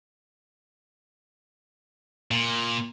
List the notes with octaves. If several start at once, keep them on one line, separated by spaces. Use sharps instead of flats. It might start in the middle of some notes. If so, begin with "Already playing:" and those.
A#2